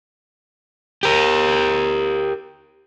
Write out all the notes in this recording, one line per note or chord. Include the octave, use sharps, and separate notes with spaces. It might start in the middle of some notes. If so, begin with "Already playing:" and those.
G4 A#4